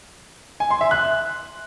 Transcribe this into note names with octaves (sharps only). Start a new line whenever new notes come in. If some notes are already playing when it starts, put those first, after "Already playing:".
G#5
C6
E5
F#6